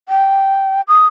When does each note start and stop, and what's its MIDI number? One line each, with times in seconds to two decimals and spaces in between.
0.09 0.81 79
0.88 1.06 87